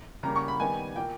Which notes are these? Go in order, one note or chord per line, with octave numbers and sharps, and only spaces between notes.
C#3 G3 A#3 A#5
C#6
B5
D#3 G3 B3 G#5
A#2 A#3 G5